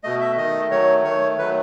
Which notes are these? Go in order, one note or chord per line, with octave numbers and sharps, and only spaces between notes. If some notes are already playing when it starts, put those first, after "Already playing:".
B2 A3 D#5
E5
D#3 A3 D#5
D#3 F#3 A3 C#5
D#3 A3 C#5
D#3 F#3 A3 B4